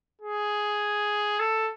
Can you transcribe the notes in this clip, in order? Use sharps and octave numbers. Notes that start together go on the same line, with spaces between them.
G#4
A4